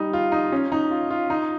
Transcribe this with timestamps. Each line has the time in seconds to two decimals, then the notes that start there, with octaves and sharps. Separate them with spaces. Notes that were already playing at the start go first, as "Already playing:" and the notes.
Already playing: G3 D#4
0.13 F4
0.32 D#4
0.52 C#4
0.72 D#4
0.91 F4
1.11 F4
1.30 D#4